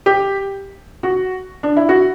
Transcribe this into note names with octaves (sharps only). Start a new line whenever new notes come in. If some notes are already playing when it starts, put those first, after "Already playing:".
G4
F#4
D4
E4
F#4